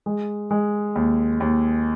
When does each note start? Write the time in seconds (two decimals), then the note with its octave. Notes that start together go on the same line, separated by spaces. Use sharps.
0.06 G#3
0.51 G#3
0.95 D#2
1.40 D#2